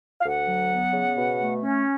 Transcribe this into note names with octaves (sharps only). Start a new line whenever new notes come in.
F5
D2 F#5
F#3
B3
C#3
B2
A3
C#4